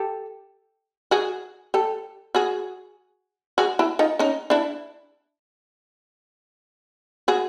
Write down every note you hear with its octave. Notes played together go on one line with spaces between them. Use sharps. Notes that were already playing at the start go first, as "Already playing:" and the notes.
Already playing: G4 A4
F#4 G#4
G4 A4
F#4 G#4
F#4 G#4
E4 F#4
D#4 F4
C#4 D#4
D4 E4
F#4 G#4